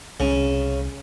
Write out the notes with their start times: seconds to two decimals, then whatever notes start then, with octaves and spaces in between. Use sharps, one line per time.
0.20 C2 C#3 C#4